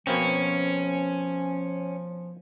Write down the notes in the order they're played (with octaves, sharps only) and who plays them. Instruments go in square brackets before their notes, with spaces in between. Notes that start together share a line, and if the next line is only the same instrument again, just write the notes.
[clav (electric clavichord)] B2 A#3 C4 [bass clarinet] F3 [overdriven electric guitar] C#4